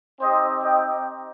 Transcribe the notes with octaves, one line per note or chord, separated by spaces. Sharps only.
C4 D#4 G4 C5 D#5
D#5 G5